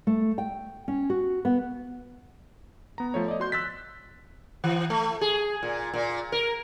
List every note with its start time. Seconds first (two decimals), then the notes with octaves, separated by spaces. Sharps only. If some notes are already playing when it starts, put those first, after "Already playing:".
0.07 A3
0.38 G5
0.88 C#4
1.10 F#4
1.45 B3
2.98 B3 A#5
3.14 F3 A3 C#5
3.28 D5 D#5
3.40 F#4 C6 G6
3.52 E6 F#6 A6 B6
4.64 E3
4.90 A3
5.21 G#4
5.63 A#2
5.94 A#2
6.32 A#4